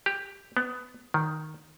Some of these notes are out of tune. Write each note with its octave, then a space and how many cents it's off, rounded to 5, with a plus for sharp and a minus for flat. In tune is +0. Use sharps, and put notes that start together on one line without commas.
G4 +10
B3 +15
D#3 +0